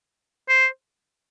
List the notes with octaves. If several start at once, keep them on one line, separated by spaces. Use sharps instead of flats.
C5